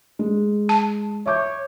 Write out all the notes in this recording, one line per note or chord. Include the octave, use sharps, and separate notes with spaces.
G#3
A5
C#5 E5 D6 G6